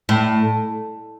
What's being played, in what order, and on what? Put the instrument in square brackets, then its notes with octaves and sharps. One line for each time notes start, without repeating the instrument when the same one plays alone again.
[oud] A2